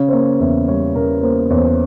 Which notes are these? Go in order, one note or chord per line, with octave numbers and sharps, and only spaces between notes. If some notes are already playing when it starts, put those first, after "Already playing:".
Already playing: C#3 C#5
C5
A#3 C#5
E2 E5
G3 C#5
C#3 A#4
A#3 C5
E2 C#5
C5
C#5